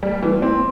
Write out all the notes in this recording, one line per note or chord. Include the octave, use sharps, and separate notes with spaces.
G3
E3
C4